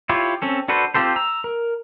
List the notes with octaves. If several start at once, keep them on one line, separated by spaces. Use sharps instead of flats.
E4 F4 G4 C#5
C4 C#4 A4
D4 F#4 A4 B4 C5
C4 F4 G4 A4 C5
A#5 E6
A#4